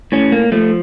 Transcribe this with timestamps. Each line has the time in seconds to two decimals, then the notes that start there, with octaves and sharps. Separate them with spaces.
0.12 A2 C#4
0.32 A#3
0.52 F3 A3